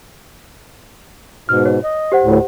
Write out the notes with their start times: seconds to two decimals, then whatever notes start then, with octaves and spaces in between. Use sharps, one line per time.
1.49 G#2 B2 F6
1.65 C#5
1.84 D#5
2.12 G4 C5 F#5
2.23 D2 A2